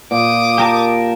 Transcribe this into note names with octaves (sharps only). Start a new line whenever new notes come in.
A#2 D6 D#6
G4 A#4 A5